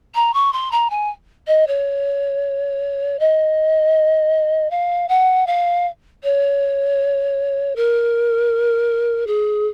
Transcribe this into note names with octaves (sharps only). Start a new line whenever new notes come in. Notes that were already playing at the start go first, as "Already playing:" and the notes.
A#5
C#6
C6
A#5
G#5
D#5
C#5
D#5
F5
F#5
F5
C#5
A#4
G#4